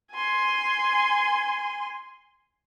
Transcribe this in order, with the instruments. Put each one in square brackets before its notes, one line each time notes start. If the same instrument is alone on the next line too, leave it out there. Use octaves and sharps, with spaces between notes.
[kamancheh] G#5 C6